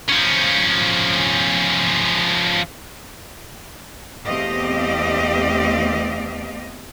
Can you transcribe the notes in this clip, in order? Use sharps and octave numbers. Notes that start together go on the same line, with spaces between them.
F3 C#4
E2 A3 C4 G4 D#5 F5